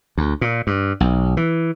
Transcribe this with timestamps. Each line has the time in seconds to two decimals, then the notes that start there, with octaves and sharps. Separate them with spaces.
0.18 D2
0.41 A#2
0.67 G2
1.00 B1
1.37 E3